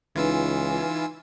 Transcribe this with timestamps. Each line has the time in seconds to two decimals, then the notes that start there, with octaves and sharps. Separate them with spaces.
0.16 C#2 E3 D#4 F4 B4 G#5 E6